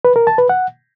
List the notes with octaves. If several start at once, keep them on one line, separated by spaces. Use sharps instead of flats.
B4
A#4
A5
B4
F#5